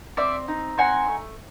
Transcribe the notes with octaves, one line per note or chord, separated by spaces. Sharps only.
C4 D5 E5
D#4
C4 F#5 G#5
A3